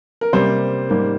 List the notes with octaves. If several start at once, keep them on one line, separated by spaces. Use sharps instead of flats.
A#4
C3 G3 A#3 C5
G#2 G3 A#3